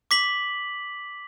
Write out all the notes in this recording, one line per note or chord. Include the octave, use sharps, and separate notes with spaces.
D6 B6 F#7